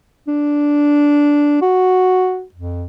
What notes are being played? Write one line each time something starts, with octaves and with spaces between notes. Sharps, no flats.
D4
F#4
F2